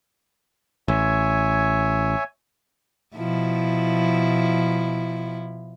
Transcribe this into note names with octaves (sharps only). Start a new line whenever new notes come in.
A1 C#5 E5 G#5
B2 F3 E4